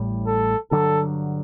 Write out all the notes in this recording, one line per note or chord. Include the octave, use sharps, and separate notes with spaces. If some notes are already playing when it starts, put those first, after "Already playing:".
Already playing: A1 A2 G3
A4
G2 D3 F#3 A4